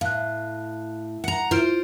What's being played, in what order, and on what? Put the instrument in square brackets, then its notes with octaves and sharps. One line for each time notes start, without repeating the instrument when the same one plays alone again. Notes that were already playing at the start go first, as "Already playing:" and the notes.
[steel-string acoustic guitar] A2 [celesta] F5 F#6
[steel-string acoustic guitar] F#5 A#5
[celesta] E4 F6 D7 [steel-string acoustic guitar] F4 C5